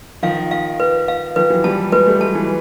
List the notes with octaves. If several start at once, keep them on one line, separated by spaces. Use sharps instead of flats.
D#3 F3 F5
F5
B4
F5
D#3 F3 B4
E3 F#3
F3 G3 A5
F#3 G#3 B4
G3 A3
F#3 G#3 A5
E3 F#3